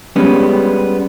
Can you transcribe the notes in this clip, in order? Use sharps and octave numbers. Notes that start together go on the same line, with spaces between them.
G3 G#3 B3 C#4